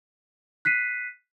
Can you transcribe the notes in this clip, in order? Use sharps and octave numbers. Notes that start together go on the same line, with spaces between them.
F#6 B6 C7 D#7